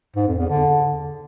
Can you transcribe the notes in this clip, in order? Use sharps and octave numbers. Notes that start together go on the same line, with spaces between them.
G#2
F2
E2
D3